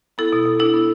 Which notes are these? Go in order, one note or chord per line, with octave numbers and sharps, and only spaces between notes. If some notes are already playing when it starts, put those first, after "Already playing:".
B3 E4 A4
B2
B2
D4 E4 A4
B3